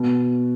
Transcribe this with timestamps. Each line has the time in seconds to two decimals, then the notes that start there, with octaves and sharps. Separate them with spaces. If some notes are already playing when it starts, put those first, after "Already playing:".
Already playing: B2